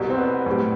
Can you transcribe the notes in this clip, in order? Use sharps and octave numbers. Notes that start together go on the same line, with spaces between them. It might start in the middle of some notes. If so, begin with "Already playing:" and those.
Already playing: C2 B2 G3
C4
B3
A2 G3